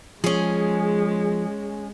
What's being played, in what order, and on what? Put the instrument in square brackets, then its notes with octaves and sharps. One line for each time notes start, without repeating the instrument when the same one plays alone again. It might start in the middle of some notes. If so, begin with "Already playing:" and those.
[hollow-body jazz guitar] F3 [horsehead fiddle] G#3 [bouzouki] C#4 G#4